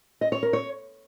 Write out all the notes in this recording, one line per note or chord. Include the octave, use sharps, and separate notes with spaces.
D#5
C#5
A#4
C#5